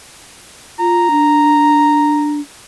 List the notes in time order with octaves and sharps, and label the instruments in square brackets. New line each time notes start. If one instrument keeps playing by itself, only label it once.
[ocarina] F4 [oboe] A#5
[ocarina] D4